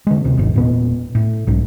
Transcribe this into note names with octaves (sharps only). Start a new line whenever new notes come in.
D3 G#3
D2 C3
G#1 E2 G#2
E1 A#2 B3
A2
B1 G#2